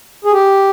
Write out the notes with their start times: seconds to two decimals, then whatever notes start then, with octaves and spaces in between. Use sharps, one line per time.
0.25 G#4
0.32 G4